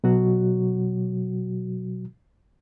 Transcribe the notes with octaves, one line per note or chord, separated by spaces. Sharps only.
B2 F#3 F#4